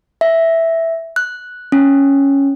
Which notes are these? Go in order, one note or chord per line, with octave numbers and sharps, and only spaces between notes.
E5
F#6
C#4